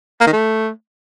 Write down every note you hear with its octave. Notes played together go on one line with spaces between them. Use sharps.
A#3
D#3
A3